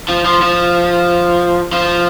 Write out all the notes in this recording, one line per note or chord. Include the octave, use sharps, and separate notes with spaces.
F3
F3
F3
F3